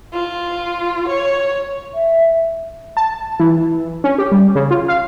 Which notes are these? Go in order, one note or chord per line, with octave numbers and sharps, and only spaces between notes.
F4
C#5
E5
A5
E3
C#4
G4
G3
C#3
F4
F5